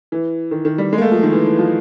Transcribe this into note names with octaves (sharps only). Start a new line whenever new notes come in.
E3
D#3
D#3
G3
G#3
A#3
A3
F3
D#3
E3
E3
F3